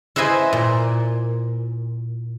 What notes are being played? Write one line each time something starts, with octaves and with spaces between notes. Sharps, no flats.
E4 B4 C5 D#5 G#5
A#2